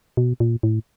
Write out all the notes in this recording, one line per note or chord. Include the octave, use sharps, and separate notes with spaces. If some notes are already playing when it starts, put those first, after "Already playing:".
B2
A#2
A2